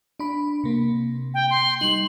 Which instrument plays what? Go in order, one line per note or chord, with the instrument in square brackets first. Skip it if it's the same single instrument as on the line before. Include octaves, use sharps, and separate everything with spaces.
[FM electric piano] D4 B5
C3 A#3
[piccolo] G5
C6
[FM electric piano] G3 D#4 [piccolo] F#7